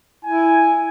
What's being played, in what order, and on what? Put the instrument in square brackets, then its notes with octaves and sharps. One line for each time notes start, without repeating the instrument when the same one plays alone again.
[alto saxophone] E4 [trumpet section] G#5